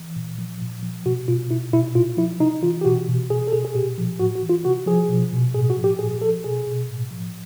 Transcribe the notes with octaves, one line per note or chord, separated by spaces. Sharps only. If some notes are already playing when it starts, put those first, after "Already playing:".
Already playing: E3
A#2
F3
A#2
F3
B2 F#4
B2 F4
B2 E4
B2 E4
A#2 F4
F3 E4
C3 D#4
E3 F4
G4
B2 F#4
B2
B2 G#4
A4
B2 G#4
G#4
A#2 G4
F3
A2 F#4
F#4
E3
F4
C3 F#4
F3 G#4
B2
B2
A2 G#4
F#4
F3
G4
A#2 G#4
F3 A4
B2 G#4
B2
A2
F3